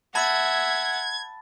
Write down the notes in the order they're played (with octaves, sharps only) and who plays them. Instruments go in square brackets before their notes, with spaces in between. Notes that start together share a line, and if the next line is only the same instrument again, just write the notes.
[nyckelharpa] E5 [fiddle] F#5 [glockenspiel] A5 B5 A6 [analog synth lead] G#6